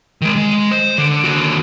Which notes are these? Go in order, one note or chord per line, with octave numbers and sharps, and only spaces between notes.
D#3 G#3
G#3
C5
D3
D#2 F#4